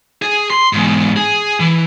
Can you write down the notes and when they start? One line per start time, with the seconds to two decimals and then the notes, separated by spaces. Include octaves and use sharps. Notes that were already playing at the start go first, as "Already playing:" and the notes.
0.22 G#4
0.50 C6
0.73 E2 G#2
1.17 G#4
1.60 E3